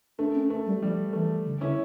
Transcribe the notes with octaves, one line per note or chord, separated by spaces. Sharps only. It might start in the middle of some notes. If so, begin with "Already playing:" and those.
A3 D4
C#4
A3
G3
F3 G3
E3 A3
D3
D3 C#4 E4